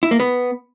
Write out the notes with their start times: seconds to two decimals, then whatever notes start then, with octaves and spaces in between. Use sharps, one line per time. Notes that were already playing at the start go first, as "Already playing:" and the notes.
0.03 E4
0.11 A#3
0.20 B3